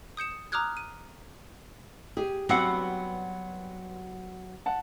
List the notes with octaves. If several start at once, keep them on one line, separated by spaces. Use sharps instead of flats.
D#6 G6 C#7 E7
A#5 D6 D#6 F6 F#6 G#6
D#7
G4 G#4
G2 F#3 B3 C4 F#4 F#5
F#5 A5